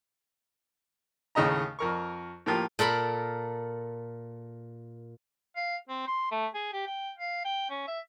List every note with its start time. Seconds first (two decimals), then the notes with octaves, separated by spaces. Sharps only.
1.35 D#2 A2 C#3 D#5 A#5
1.79 F2 A#4 C#6
2.46 A2 F3 A#3 F4 G4
2.79 A#2 A4 A#4 B5
5.56 F5
5.89 C4
6.07 C6
6.31 A3
6.54 G#4
6.73 G4
6.87 G5
7.18 F5
7.45 G5
7.70 C#4
7.87 E5